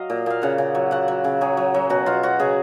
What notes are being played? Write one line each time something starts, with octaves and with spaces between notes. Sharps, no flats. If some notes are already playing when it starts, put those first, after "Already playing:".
Already playing: F#3 D#5 F5
A#2
A#2 F5
C#3 F#5
C#3
F#3
C#3 F#5
F#3
C#3
F#3 G#4
F#3
F#3
B2 F#4
B2 F4
F#3 F#4
C#3 G#4